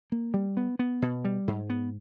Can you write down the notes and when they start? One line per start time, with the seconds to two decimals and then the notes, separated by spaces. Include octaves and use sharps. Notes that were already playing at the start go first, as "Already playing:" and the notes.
0.12 A#3
0.34 G3
0.57 B3
0.79 B3
1.02 B2
1.25 G3
1.48 G#2
1.70 B3